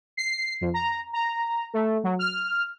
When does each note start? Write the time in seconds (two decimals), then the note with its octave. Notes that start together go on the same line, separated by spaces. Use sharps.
0.17 C7
0.61 F2
0.74 A#5
1.13 A#5
1.73 A3
2.04 F#3
2.19 F6